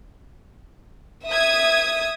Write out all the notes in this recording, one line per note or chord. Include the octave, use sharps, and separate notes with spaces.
E5 D#6 G#6